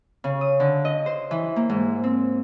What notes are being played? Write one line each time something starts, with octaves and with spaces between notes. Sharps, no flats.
C#3
D#6
D3
D#5
C5
E3
A#3
G#2
C4